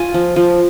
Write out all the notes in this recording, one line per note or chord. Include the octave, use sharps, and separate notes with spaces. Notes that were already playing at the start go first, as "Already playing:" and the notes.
Already playing: F4 G#5
F3
F3